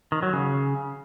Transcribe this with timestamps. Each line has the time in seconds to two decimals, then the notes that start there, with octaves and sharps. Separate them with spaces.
0.12 D#3
0.23 F#3
0.33 C#3